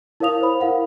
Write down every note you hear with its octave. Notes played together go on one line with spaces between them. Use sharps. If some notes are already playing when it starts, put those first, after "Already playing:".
E4 A#4 C#5 F5 D#6 F7
C5 B5
E4 A#4 F5 F#5